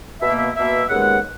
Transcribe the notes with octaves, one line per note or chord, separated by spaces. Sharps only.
B2 A#3 E5
E5
B2 A#3 E5
D#2 C#3 G#3 B3 F#5